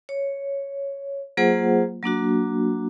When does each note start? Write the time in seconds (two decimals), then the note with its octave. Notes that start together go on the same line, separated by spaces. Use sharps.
0.09 C#5
1.37 F#3 A#3 F4 G#4 C5 F#5
2.03 F#3 A#3 D4 F#4